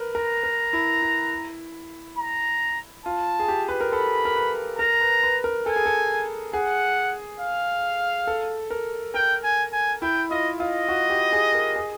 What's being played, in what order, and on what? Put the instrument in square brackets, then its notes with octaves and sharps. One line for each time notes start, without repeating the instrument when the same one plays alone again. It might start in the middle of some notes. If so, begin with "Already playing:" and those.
Already playing: [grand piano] A#4 B4
[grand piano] A#4 [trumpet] A#5
[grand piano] A#4
E4
E4
[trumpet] A#5
[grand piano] F4 [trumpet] A5
[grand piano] G#4
G4
B4
A#4
[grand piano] A4 [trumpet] B5
[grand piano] A#4
B4
[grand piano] A#4 [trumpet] A#5
[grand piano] B4
B4
A#4
[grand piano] A4 [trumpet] G#5
[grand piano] G#4
A4
[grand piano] G#4 [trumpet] F#5
[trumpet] F5
[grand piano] A4
A#4
[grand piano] A#4 [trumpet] G5
[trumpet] G#5
G#5
[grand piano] E4 [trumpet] G5
[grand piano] F4 [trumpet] D#5
[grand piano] F4 [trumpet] D#5
[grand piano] F#4
G4
G#4
A#4
G#4